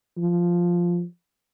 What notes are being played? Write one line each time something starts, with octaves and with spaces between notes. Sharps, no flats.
F3